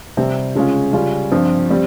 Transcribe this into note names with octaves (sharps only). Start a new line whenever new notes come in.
C3 G3 C4
C#3 G#3 C#4 F4
C#3 G3 C#4 F4
G2 F3 C4 F4
G3 C4